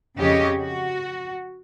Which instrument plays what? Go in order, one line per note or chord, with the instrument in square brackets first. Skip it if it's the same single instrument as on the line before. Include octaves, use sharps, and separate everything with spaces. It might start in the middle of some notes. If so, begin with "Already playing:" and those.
[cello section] F2 C#3 C#4 G4 C#5 D#5
F#4